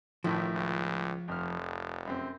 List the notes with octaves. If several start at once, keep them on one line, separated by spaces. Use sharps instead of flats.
A1 A2 D#3 F3 E4
C#2
F1 F2 F6
F#2 C4